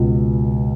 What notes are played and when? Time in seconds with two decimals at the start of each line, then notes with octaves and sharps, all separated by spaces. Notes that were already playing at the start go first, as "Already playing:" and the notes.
Already playing: C#2 B2